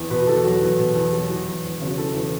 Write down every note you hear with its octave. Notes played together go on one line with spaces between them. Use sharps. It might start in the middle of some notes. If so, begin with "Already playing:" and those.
Already playing: E2 E3
B2 B4
F#4
E2 A4
F#3 F#4
E2
B2
E2
F#3
E3 F#4
E2
E1
C#3
F#4
E3 A4
E2